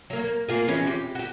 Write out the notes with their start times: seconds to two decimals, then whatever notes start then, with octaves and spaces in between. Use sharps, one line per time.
0.10 F#3 A#3
0.24 A#3
0.49 A#3 F4 G#4
0.68 E3 G#3 C#4
0.87 G4
1.15 F#4 G4